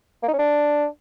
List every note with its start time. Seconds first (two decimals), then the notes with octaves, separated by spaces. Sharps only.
0.23 A#3
0.28 D#4
0.33 C#4
0.39 D4